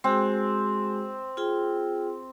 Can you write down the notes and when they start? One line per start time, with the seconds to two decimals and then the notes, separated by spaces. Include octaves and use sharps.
0.04 G#3 C4 F#4 G#4
1.37 F4 G#4 G5